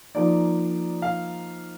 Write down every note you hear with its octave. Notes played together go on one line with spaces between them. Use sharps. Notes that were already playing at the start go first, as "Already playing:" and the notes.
F3 A#3 D#4 D5
F5